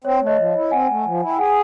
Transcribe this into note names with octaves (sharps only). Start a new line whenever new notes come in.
C4 C#5
A3
C#5 D#5
F3
E4
C4 F#5 G#5
A3
F3
E4
G5
G#4 F#5 G#5